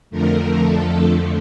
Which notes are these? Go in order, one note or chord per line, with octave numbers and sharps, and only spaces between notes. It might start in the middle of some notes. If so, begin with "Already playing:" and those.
F2 D3 F3 A3 A#4
A4